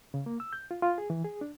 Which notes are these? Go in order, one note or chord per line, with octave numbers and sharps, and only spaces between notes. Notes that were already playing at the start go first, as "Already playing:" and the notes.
C#3
A#3
E6
G6
F4
F4
G#4
E3
G#4
D4